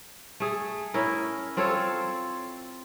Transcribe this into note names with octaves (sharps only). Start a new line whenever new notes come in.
A3 G#4
C#4 E4 A#4
C4 F4 A4 C#5